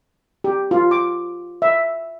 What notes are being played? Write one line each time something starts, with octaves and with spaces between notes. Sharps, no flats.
G4
F4
D6
E5